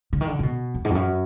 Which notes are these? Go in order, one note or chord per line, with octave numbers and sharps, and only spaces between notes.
D3
D#3
D3
D3
B2
F2
G#2
F2
F#2